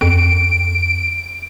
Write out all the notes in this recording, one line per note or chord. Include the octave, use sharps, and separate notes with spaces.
F2 D7